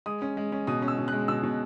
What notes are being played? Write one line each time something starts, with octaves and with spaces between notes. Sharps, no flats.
G#3 D#6
C#4
G#3
C#4
B2 D#6
C#4
E6
B2
G#3 F#6
B2 E6
B2